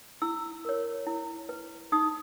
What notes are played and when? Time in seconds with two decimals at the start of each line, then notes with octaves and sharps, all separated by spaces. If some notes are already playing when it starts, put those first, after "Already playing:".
0.22 E4 E6
0.65 A#4 C#5
1.07 E4
1.49 B4
1.92 D#4 D#6